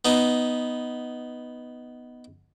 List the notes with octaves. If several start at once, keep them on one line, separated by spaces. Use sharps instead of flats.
B3 D#4